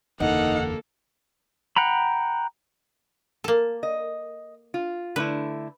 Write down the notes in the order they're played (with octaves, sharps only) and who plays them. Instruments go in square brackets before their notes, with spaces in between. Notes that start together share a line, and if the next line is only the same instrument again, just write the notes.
[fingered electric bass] F#1 E2 D3 [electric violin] A#3 A4 [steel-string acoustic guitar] D#4 [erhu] F#5
[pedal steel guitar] F#5 G5 A#5 B5
[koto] A#3 A4
[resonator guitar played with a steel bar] D#5
F4
[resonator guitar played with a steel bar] D3 A3 E4 [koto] B4